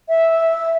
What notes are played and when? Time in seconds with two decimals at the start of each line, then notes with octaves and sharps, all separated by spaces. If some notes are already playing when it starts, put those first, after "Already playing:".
0.09 E5